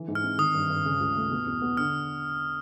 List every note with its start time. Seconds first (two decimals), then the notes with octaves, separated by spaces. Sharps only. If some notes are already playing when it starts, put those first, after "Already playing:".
Already playing: E3
0.08 G#2
0.15 F6
0.24 C4
0.38 D#3 D#6
0.54 G2
0.70 G2
0.85 C#3
1.00 C#2
1.16 A3
1.31 B2
1.46 E2
1.62 B3
1.77 D3 F6